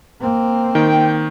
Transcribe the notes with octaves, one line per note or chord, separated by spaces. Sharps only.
A#3 C4
D#3 G5